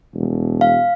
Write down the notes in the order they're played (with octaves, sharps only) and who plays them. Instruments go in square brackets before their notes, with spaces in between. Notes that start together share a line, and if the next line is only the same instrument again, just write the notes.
[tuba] E1
[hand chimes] F5